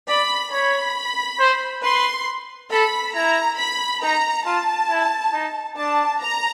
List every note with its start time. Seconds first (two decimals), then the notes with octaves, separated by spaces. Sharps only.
0.08 D5 B5
0.52 C#5 B5
1.39 C5
1.83 B4 C6
2.71 A4 B5
3.14 E4 A#5
3.58 B5
4.02 D#4 A#5
4.45 F4 A5
4.90 E4
5.33 D#4
5.77 D4 A5
6.21 A#5